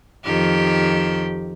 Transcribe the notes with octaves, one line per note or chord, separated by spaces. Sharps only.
F2 D#3 G4